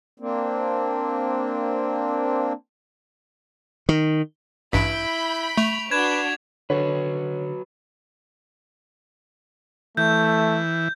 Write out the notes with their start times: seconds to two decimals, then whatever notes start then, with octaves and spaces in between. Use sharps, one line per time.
0.20 A#3 C4 D4
3.89 D#3
4.73 A1 G2 E4 B5 G6 B6 D7
5.57 A3 C#6 F7
5.91 D4 F#4 B4 G#6 E7
6.70 D3 F#3 F#4 B4 C#5
9.97 E3 A3 G6